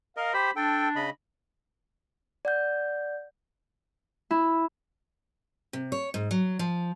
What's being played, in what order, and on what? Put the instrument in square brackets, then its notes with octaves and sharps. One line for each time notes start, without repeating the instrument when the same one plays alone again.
[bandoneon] A#4 D#5 [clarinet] F5
[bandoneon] G4 C5 [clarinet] B5
[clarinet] D4 [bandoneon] A4 G5
[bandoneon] C#3 D#5 B5
[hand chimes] D5 F#5 G6
[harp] E4
[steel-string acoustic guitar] C3
C#5
G#2
F#3
F3